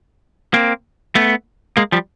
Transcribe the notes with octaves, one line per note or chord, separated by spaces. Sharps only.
A#3 C4
A3 B3
G#3 A#3
F3 G3